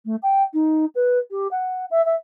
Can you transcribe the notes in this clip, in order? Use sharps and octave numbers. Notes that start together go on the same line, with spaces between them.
A3
G5
D#4
B4
G4
F#5
E5
E5